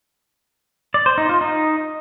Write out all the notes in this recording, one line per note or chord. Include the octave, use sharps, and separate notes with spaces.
D5
C5
D#4
F4
D#4